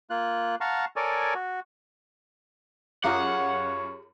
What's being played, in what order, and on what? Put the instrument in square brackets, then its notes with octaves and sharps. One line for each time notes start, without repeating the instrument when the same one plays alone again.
[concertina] A#3 F4 F#6
F5 F#5 A5 A#5 C#6 F6
A4 A#4 C#5 D5 G#5
F#4
[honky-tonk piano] F#2 F4 [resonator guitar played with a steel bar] G4 G#4 A#5 [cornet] C#5 [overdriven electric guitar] F#5